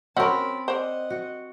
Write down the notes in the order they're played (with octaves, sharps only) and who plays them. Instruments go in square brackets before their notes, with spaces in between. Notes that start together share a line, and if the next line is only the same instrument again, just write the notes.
[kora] C4 A#4 [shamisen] C#4 F#4 [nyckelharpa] A5 B5
[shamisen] C5 D5 [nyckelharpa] D#5 F#5
[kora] F#4